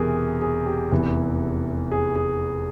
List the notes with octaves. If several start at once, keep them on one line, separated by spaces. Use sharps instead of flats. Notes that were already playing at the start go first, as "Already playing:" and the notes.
Already playing: E1 E2 C3 E3 G#4 A#4
G#4
G4
F1 E2 E3
G#4
G#4